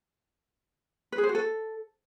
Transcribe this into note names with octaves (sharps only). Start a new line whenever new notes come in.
B4
G#4
C5
F#4
A4